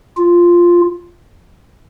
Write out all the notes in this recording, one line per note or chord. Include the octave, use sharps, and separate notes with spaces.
F4